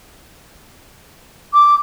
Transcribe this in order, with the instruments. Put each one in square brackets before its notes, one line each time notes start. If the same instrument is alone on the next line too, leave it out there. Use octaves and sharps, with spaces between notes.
[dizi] D6